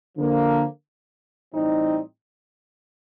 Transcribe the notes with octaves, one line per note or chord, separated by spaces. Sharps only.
D3 F3 A#3
A2 E3 G3 C4 D#4